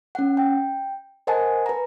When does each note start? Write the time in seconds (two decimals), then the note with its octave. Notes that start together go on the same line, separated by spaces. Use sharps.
0.15 C#4 F#5
0.37 G5
1.27 A#4 C5 D#5 F#5 G#5 A5
1.66 B4 A#5